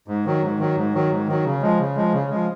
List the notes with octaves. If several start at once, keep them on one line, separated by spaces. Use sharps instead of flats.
G#2
D#3 F#3
G#2
D#3 F#3
G#2
D#3 F#3
G#2
D#3 F#3
C#3
F3 G#3
C#3
F3 G#3
C#3
F3 G#3